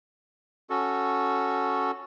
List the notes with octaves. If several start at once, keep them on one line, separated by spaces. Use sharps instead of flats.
C#4 F#4 A4